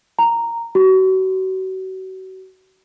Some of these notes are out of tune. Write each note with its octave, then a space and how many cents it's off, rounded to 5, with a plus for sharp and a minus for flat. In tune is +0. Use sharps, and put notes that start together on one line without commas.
A#5 -5
F#4 +35